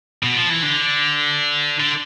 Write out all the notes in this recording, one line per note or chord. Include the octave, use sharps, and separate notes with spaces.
B2
F3
E3
D3
D3